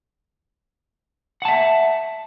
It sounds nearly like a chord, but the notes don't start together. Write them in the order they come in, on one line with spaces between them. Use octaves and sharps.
F#5 A5 E5